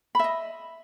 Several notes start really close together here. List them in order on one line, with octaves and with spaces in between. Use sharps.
B5 E5 D#5